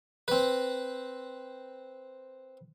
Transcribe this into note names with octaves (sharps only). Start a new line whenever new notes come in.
C4 B4